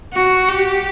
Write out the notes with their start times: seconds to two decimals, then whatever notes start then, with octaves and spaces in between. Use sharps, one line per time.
0.14 F#4
0.49 G4